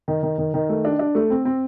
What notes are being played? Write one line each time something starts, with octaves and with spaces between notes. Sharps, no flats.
D#3
D#3
D#3
D#3
A3
D4
D4
A3
C4
C4